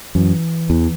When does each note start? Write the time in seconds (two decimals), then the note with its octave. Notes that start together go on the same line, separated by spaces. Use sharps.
0.15 F#2 E3
0.70 E2